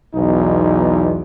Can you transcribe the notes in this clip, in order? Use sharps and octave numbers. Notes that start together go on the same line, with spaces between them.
B1 E2 D#4